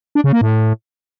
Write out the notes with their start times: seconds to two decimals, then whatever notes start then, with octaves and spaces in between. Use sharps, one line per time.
0.15 D4
0.24 C#3
0.33 A#3
0.41 A2